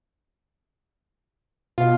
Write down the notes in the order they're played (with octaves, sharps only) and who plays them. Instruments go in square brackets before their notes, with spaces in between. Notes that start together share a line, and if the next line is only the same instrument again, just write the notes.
[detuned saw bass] B2 [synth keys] F4